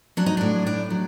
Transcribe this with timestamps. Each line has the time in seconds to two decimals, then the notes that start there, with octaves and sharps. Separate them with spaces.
0.17 F#3 D4
0.26 D#4
0.37 A2 D4
0.66 A2 D4
0.90 F#3